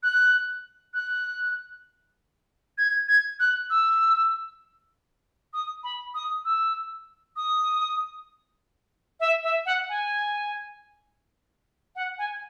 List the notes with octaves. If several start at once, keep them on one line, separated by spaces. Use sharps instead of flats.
F#6
F#6
G#6
G#6
F#6
E6
D#6
B5
D#6
E6
D#6
E5
E5
F#5
G#5
F#5
G#5